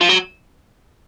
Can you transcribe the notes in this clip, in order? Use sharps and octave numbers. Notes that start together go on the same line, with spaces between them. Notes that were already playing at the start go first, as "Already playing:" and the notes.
F3
F#3